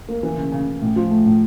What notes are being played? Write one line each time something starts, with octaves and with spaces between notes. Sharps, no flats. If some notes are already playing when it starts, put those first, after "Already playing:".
A#3
E3
C#3
C#3
C#3
A2
F3
A3
A2